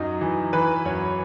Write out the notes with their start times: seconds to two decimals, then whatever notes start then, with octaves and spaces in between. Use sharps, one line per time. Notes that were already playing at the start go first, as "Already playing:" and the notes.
Already playing: F#2 F#3 D#4
0.21 E3
0.53 E3 B4
0.85 F#2 C#5